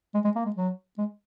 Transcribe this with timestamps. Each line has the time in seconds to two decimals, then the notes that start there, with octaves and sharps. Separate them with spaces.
0.14 G#3
0.25 G#3
0.36 A#3
0.46 G#3
0.56 F#3
0.98 G#3